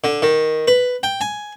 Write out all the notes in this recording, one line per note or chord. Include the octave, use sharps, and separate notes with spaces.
D3
D#3
B4
G5
G#5